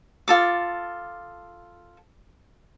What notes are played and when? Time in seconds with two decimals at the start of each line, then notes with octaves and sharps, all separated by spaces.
0.28 F4 A4 D6